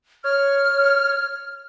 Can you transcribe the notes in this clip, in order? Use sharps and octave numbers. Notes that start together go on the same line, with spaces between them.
C#5 F6